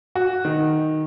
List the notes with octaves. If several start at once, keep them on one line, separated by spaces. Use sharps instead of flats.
F#4
D#3